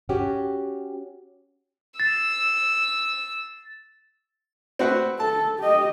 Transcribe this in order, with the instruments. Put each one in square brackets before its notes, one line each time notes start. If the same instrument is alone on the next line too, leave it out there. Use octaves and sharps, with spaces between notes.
[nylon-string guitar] C#4 F#4 G4
[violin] E6 [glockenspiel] A6 C7
[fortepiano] C4 F#4 B4
[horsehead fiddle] A4 [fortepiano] A5
[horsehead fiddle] G4 D#5